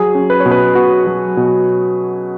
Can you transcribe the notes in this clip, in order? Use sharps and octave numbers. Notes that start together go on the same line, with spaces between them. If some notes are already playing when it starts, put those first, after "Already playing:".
Already playing: F#3 G#4
C#4
B4
C#5
B2
B4
B2 F#4
F#3
B2